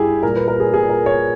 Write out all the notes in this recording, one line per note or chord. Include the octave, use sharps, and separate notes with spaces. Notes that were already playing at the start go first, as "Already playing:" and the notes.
Already playing: G2 E4 G4 G#4
A#2 G3 A#4
B4
A#4
G#4
A#2 G3 G#4
A#4
C#5